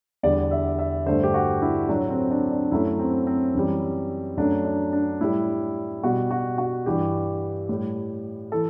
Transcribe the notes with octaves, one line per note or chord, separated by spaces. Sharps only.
E2 D3 G3 D5
E5
E5
G2 D3 A3 C5
G4
F#4
E4
A2 F#3 A3 D4
C4
D4
D4
F#2 F#3 A3 E4
C4
C4
F#2 E3 G3
F#2 F#3 A3 D4
D4
D4
A2 G3 E4
B2 G3 F#4
F#4
F#4
G2 E3 G3 G4
A2 G3
E3 A4